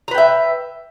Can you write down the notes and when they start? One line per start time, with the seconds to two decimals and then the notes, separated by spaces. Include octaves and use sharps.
0.08 A#5
0.11 B4
0.14 G5
0.18 E5